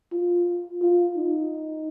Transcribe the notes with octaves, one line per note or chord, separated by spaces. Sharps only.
F4
F4
D#4